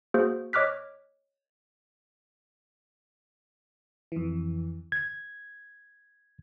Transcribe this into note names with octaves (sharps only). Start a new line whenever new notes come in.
A#3 F#4 G#4 C5
C#5 D#5 D6 F6 F#6 B6
F2 E3
G#6